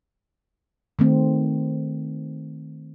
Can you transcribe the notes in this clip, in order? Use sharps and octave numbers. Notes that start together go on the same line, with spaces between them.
D#3 A3 C4